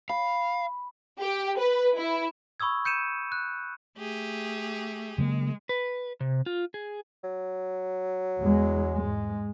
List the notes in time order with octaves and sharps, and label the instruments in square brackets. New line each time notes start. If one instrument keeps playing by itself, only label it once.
[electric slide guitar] F5 [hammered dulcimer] B5
[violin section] G4
B4
E4
[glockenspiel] B5 C#6 D#6 E6 G#6
G6 C#7 D#7 E7
F#6
[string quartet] A3 G4 G#4
[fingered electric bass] C#3 F#3 A#3 [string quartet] G#3
[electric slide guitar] B4
C3
F4
G#4
[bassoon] F#3
[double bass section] E2 G#3
G#2 G#3